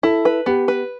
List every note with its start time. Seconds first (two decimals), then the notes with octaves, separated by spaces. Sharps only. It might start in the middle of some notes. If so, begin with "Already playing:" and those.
0.03 E4 A4
0.25 B4
0.46 B3 G4
0.68 B4